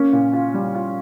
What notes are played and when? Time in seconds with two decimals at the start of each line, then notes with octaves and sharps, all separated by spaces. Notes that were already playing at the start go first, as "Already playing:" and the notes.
Already playing: A#3 C#4
0.13 A#2
0.33 F4
0.54 G3
0.75 F4